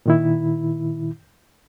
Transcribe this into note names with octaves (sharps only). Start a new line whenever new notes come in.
A#2 D#3 E4